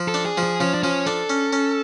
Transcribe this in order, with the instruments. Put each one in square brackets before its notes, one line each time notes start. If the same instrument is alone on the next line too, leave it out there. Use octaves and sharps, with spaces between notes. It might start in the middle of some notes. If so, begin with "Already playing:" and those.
Already playing: [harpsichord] F3
[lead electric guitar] A4
[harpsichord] D4
[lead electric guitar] G#4
[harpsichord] F3
[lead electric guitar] G#4
[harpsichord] F3 [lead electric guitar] C#4
[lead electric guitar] D4
[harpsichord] F3 [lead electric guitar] C#4
[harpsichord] D4 [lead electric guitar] A4
[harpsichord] C#4
C#4